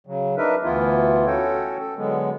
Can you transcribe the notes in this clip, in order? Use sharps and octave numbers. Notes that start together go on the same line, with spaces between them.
C#3 F#3
D4 D#4 A#4 B4 E5
D2 E3 B3 E4 F4
C#4 F#4 A4 C#5 G5
A4
D3 F#3 G#3 B3